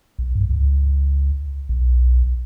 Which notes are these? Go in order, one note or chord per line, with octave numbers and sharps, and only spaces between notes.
B1
G2
C#2
B1